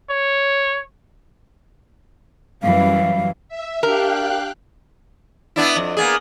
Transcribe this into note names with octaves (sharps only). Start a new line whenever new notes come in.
C#5
F#2 E3 G3 F5
E5
D4 G4 A#4 F5 G5 F#6
B3 D4 E4
F2
A#3 B3 G#4